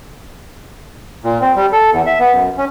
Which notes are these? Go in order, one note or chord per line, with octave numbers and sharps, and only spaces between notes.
A#2
C4
G3
A4
E2
E5
B3
F#2
C#4